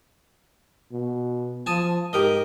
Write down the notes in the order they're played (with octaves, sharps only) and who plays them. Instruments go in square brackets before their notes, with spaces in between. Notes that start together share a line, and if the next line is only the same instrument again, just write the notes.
[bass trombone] B2
[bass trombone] F3 [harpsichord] G#5 A5 D#6
[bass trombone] G#2 [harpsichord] G4 A#4 D#5